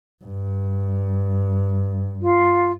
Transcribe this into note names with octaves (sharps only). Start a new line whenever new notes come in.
G2
F4